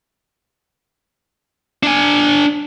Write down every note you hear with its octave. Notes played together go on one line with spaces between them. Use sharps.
D4 G#5